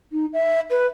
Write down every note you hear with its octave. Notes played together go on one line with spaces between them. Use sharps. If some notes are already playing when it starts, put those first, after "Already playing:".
D#4
E5
B4